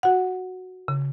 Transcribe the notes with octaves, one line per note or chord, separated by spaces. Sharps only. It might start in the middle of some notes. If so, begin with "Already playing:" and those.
F#4 F#5
C#3